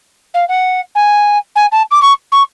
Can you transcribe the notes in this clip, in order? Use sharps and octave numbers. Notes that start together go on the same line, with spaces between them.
F5
F#5
G#5
G#5
A5
D6
C#6
C#6